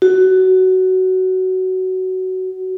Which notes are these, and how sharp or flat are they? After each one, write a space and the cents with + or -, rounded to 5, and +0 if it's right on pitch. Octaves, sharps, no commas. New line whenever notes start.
F#4 +15